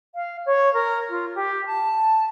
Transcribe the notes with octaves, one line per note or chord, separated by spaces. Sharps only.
F5
C#5
A#4
F4
G4
A5